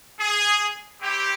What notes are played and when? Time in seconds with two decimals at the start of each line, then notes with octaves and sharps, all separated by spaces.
0.19 G#4
0.99 C4 E4 G4